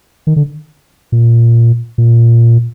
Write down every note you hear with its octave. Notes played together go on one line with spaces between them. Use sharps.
D#3
D3
A#2
A#2